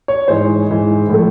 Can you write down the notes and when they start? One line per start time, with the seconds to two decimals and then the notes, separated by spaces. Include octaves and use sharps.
0.08 C#5
0.28 G#2 E3 G#3 C5
0.69 G#2 E3 G#3
1.09 A2 F3 A3